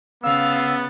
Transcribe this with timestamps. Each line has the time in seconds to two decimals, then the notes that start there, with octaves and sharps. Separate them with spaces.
0.23 C#3 B3 F5 E6 A6